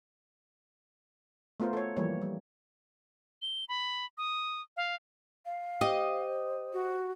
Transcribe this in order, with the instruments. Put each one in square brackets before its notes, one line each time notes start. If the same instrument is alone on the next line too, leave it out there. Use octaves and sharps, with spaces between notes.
[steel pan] A3 B3 F4 A#4 C5
A4 C#5
E3 F3 G3 A#3 C#5
G3
[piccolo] G7
B5
D#6
F5
[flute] F5
[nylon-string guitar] G4 [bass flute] C5 [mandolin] D#5
[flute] F#4